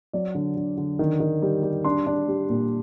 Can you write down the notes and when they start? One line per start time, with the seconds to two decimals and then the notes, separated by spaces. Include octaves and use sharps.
0.13 F#3 D5
0.35 D3
0.57 D3
0.78 D3
0.99 D#3
1.20 D#3
1.42 G3
1.63 G3
1.84 D4 C6
2.07 D4
2.28 G3
2.50 A#2